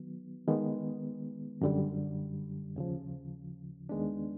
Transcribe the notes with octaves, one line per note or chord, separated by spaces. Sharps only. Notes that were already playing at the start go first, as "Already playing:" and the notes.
Already playing: D#3 F#3 B3
D#3 G#3 B3
F#2 D3 G3
D#2 C#3 F3
D#2 D#3 G#3 B3 D4